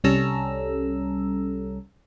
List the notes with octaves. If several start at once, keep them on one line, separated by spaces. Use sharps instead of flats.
C2 G3 C#4 A4 A#5 E6